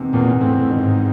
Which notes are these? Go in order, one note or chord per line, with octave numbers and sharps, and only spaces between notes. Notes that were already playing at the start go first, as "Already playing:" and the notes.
Already playing: E2 C3 D#3
E2 A#2
A2 C4
A2
D#3
G#2